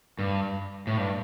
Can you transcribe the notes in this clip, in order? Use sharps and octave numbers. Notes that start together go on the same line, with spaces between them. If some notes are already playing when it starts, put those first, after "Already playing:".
G2
A2
G2